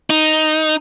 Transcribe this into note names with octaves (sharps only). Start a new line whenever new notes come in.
D#4